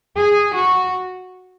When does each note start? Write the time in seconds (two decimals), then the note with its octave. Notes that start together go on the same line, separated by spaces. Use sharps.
0.16 G#4
0.55 F#4